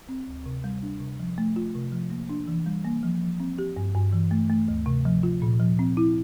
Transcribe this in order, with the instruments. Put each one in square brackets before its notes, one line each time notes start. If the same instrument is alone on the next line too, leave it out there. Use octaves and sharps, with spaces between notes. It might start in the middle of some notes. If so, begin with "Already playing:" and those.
[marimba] C4
D2
C3
G3
D4
C3
F3
A3
F4
C3
F3
A#3
D4
E3
G3
A#3
F3
F3
C4
G4
G2
G2
E3
A3
A3
D2
C3
F3
F4
A#2
F3
C4
E4